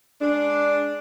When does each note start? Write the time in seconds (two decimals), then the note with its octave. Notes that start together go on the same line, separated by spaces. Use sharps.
0.20 G#3 D4